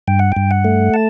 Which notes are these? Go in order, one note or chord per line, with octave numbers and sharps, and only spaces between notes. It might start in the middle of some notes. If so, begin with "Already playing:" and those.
G2 G5
F#5
G2 G5
F#5
A3
A5